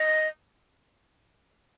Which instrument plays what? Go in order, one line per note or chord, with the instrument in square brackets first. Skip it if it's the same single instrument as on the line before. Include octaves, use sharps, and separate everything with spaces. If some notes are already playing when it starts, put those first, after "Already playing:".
Already playing: [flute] D#5